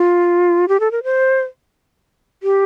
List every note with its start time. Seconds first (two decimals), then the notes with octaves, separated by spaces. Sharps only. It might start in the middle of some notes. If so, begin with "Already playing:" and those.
Already playing: F4
0.68 G4
0.80 A4
0.91 A#4
1.04 C5
2.43 G4